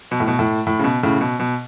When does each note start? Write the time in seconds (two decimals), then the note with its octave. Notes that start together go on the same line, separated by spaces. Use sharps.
0.11 B2
0.20 A2
0.28 B2
0.39 A2
0.67 A2
0.79 C#3
0.84 B2
1.03 A2 C#3
1.21 B2
1.40 B2